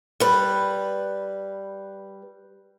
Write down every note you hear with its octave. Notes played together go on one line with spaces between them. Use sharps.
G3 B4